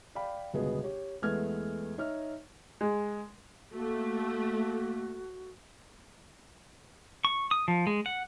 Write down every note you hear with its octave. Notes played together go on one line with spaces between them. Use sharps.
D5 F5 G5 B5
G1 C#2 B2 B3 G#4 D#5
G4 C#5
E2 G#3 A3 B3 F6 G#6
D#4 C#5 E5 F6
G#3
A3 A#3 F#4
C#6
D#6
F3
G#3
F#5